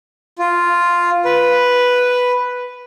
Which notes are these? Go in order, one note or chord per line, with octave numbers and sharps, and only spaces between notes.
F4
B4